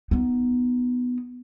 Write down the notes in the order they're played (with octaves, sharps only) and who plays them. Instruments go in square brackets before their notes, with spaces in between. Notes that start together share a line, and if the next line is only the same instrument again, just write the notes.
[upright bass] B3 D#4